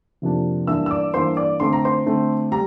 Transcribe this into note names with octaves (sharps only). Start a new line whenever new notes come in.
F2 C3 F3 A#3 D4
G2 E3 A#3 D4 E5 E6
E6
D5 D6
G2 E3 A#3 D4 C5 C6
D5 D6
D3 A3 C4 C6
A#5
C5 C6
D3 A3 C4
G3 A#5